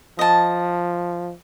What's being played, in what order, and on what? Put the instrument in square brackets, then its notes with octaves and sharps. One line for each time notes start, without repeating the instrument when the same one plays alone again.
[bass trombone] F3 [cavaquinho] D#5 A5